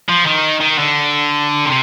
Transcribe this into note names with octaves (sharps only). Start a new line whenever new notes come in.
F3
D#3
D#3
D3
C3